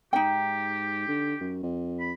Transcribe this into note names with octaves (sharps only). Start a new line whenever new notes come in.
G#2 D#4 G4 G5
D3
F#2
F2
B5